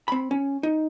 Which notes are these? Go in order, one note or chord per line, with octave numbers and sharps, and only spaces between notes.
C4 B5
C#4
D#4